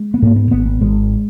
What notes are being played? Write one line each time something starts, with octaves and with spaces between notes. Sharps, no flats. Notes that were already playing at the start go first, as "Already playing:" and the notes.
Already playing: G#3
B3
G#2 A#3
B3
G#1 B3
B3
G#1 G#3